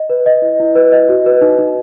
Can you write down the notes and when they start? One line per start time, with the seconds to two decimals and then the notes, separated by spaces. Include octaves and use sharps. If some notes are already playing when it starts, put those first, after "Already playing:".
Already playing: D#5
0.10 B4
0.26 D#5
0.42 E4
0.60 E4
0.75 B4
0.92 D#5
1.09 F#4
1.26 B4
1.41 D#4
1.58 D#4